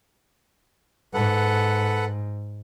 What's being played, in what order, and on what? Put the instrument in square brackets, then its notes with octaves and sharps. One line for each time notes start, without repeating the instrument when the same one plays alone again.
[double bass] G#2 [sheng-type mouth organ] A4 B4 F#5